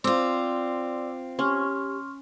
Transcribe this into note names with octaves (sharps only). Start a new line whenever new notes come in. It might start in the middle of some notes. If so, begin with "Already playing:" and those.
C4 F4 D5 C6 D6 E6
C#4 G4 C6 C#6 F6